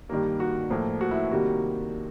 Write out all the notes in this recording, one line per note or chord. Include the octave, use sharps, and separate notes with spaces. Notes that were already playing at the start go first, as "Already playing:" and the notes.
G2 D#3 G3 A#3
F#4
A2 F3 A#3
F#4
E4
C3 D#3 G3 A#3 F#4